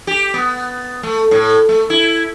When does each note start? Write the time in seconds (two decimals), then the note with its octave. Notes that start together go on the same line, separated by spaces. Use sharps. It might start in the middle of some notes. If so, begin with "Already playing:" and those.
0.07 G4
0.34 B3
1.03 A3
1.31 A2
1.69 A3
1.90 E4